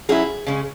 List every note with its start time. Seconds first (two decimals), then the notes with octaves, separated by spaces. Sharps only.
0.09 F#3 C#4 E4 G#4
0.46 C#3 G#3 C#4